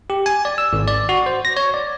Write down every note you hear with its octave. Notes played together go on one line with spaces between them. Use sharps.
G4
G#5
D5
E6
G#1
D5
F#4
C5
A#6
C#5
D5